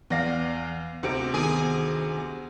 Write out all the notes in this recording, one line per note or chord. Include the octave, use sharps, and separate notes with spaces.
E2 B3 D5 F5 A#6
D2 C3 D7
D#3 B3 G#4